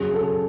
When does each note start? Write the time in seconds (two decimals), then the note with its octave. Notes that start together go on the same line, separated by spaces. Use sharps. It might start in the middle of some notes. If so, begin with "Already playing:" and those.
Already playing: F#2 C#3 F#3 G#4
0.14 A4